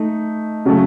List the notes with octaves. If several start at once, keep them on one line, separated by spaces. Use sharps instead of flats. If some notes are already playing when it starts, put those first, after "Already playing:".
Already playing: A3 D#4
C#3 F#3 A3